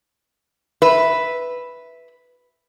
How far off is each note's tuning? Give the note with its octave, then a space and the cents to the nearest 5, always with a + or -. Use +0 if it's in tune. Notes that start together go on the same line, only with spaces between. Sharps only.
B4 +0 E5 -5